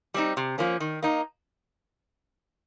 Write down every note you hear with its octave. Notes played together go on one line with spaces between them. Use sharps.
G3 C4 D#4
C3
F3 A#3 C#4
D#3
A#3 D#4